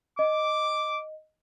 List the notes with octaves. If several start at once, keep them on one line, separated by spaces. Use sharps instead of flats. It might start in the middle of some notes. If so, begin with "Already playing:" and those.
D#5 D6